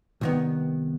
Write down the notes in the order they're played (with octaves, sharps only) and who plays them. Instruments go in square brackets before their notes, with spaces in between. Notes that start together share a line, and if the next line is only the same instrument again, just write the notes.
[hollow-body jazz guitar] C2 D#3 B3